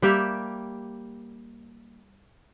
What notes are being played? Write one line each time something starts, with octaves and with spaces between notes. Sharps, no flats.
G3 A#3 G4 E5